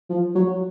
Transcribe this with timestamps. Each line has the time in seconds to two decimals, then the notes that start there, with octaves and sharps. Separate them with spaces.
0.10 F3
0.35 F#3